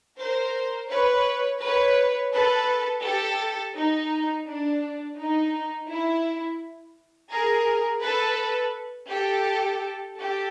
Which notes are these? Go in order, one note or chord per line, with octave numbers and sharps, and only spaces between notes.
A#4 C5
B4 C#5
B4 C#5
A4 B4
G4 A4
D#4
D4
D#4
E4
G#4 A#4
A4 B4
G4 A4
G4 A4